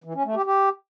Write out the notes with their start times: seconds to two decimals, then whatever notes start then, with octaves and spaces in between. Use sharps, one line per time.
0.04 E3
0.14 C#4
0.25 A3
0.35 G4
0.46 G4